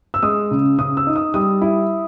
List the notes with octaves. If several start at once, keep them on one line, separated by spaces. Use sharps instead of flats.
E6
G#3 D#6
C#3
C#3 D#6
E6
D#4
D#6
G3 D#6
E4